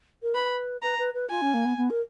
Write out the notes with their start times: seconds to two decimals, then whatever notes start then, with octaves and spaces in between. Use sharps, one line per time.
0.22 A#4
0.34 B4 B5
0.82 B4 A#5
0.98 B4
1.14 B4
1.30 F4 G#5
1.42 C#4
1.54 A#3
1.65 B3
1.77 B3
1.90 A#4